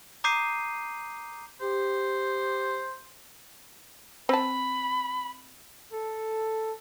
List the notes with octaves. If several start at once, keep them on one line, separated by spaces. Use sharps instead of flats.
A#5 D6 D#6 G6 C7 D#7
G4 C5
C4 A5 B5
A4